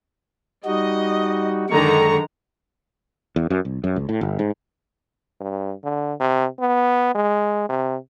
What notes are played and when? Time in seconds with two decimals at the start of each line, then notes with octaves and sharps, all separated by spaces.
0.65 G3 D#4 F#4 D#5
1.69 F#2 D3 D#3 G#3 A#5 C#6
3.36 E2
3.50 F#2
3.65 C2
3.84 F#2
3.96 C#2
4.09 A2
4.21 G1
4.39 G#2
5.41 G2
5.84 D3
6.20 C3
6.60 B3
7.15 G#3
7.69 C3